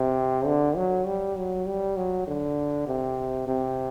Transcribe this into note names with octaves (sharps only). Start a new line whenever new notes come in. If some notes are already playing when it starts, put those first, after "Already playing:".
Already playing: C3
D3
F#3
G3
F#3
G3
F#3
D3
C3
C3